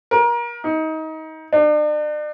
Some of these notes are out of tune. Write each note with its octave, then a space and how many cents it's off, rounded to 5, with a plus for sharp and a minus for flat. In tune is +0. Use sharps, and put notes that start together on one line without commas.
A#4 +30
D#4 +25
D4 +40